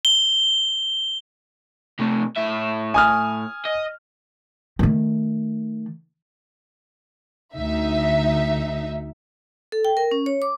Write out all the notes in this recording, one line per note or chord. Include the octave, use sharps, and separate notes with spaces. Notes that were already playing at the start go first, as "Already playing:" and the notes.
G7
C3 A3
A2 E5
G#5 D#6 F6
D#5
D#3 A3
D2 D#4 E5
A4
G5
A#4
C#4
C#5
D6